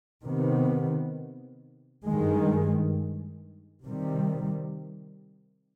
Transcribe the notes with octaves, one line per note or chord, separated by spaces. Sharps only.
C3 D#3 B3
G2 D#3 G#3
C3 D#3 G3